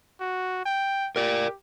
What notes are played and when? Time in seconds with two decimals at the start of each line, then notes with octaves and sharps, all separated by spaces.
0.20 F#4
0.66 G5
1.16 G4 A#4 D5